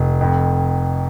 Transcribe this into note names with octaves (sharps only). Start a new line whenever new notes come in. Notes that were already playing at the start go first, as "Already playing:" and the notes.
Already playing: F1
F2